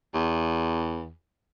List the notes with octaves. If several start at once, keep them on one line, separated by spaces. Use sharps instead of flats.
E2